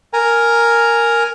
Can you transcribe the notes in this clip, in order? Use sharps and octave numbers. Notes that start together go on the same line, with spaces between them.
A#4 G#5 A#5